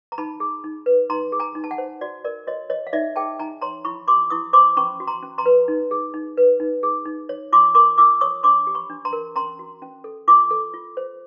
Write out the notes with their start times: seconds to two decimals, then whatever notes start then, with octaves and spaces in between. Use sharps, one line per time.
0.12 A#5
0.18 D#4 A5 B5
0.40 G#4
0.64 D#4
0.86 B4
1.10 D#4 A#5 C6
1.32 G#4
1.40 G#5 A#5
1.55 D#4
1.64 A5
1.71 F#5 G#5
1.78 C5
2.01 F#4 D5
2.25 A#4 D5
2.47 F#4 C#5 D#5
2.70 C#5 D#5
2.87 F5
2.93 D#4 D5 E5
3.16 G#4 G5 A5
3.39 D#4 G#5 A#5
3.61 C#5 A#5 C6
3.85 E4 B5 C#6
4.08 G4 C6 D6
4.30 E4 C#6 D#6
4.53 C5 C6 D6
4.77 C#4 B5 C#6
5.00 F#4
5.07 A#5 C6
5.23 C#4
5.38 A#5 C6
5.46 B4
5.68 D#4
5.91 G#4
6.14 D#4
6.37 B4
6.60 D#4
6.83 G#4
7.06 D#4
7.29 C#5
7.52 F4 C6 D6
7.75 A#4 C6 D6
7.98 F4 D6 E6
8.21 C#5 C#6 D#6
8.43 D4 C6 D6
8.67 G4
8.75 B5 C#6
8.90 D4
9.05 A#5 C6
9.13 A#4
9.36 C#4 A#5 C6
9.59 F#4
9.82 C#4
10.04 A4
10.28 F4 C6 D6
10.51 A4
10.74 F4
10.97 C5